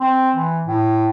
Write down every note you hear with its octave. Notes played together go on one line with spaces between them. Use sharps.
C4
E3
A2